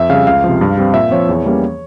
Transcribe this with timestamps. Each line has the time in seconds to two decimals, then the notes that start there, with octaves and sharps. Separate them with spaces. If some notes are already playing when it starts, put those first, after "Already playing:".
Already playing: F2 E5
0.09 C#3 G3 F5
0.27 C#2 F5
0.44 C3 F3
0.61 G2
0.78 G3 C4
0.94 A#2 E5
1.11 F3 C4 C#5
1.29 E2
1.45 E3 G3 A#3 C#4